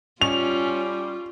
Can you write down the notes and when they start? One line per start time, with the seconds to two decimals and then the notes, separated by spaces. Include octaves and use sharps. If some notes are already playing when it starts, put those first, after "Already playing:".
0.21 G3 C#4 F4 F7